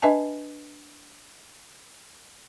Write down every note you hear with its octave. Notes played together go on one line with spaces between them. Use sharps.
D4 B4 D#5 E5 G#5 A5